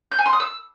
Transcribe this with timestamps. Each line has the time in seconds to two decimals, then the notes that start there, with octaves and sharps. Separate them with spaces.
0.12 G6
0.19 G#5
0.26 C6
0.33 D#6
0.40 E6